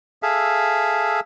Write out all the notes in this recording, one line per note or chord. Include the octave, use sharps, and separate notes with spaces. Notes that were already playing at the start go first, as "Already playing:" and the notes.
G#4 A4 E5 F5